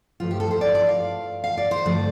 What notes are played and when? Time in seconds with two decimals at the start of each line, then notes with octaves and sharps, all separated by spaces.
0.20 G2 F3 A3 F4
0.31 G4
0.40 A4
0.51 C5
0.61 D5
0.75 D5
0.88 F5
1.44 F5
1.58 D5
1.71 C5
1.85 G2 D3 F3 A3 D5